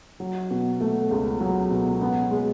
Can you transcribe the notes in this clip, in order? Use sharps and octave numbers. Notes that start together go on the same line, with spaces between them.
F#3
B2
A3
C#2
F#3
B2
B3
G#3